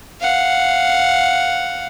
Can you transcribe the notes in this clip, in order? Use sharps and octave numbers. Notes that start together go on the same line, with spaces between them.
F5 F#5